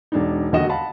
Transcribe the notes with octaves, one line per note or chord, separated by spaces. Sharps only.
E1 D4 D#4
E1 D#2 D3 F#4 D#5 E7
F5 F#5 A5 B5